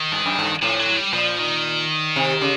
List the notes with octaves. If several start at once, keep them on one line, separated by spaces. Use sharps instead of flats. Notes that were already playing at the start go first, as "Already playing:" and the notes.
Already playing: D#3
G2
F#2
G2
A2 F3
F#3
G3
A#2 F3
D#3
C3
C#3